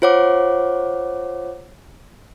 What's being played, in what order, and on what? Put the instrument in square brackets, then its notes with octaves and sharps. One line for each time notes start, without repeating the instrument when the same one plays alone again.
[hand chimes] F4 C5 C#5 F#5 D6